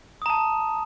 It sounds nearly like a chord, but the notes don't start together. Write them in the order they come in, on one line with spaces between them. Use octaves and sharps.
D#6 A#5 A5